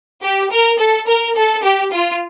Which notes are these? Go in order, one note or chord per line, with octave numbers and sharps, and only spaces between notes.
G4
A#4
A4
A#4
A4
G4
F4